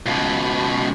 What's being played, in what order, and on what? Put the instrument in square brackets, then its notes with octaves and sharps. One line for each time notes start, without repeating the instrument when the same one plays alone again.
[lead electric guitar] C#2 B2